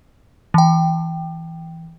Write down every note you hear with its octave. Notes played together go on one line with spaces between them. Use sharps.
E3 G5